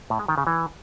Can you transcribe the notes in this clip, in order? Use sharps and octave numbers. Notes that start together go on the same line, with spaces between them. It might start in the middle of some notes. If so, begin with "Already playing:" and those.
A2
G#3
D#3
C#3
E3